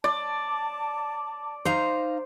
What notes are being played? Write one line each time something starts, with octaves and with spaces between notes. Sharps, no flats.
D5 A5 D6
D#4 C5 F5 A#5